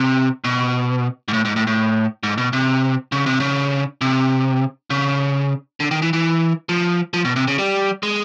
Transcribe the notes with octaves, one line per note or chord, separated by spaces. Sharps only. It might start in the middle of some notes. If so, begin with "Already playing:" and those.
Already playing: C3
B2
G#2
A2
G#2
A2
A2
G#2
B2
C3
C#3
C3
C#3
C3
C#3
D3
D#3
E3
E3
F3
F3
B2
C3
C#3
G3
G#3